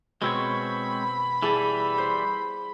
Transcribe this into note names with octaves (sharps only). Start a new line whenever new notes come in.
B2 G#3 C4 C#5 B5
E3 G3 E4 G#4 A5
C5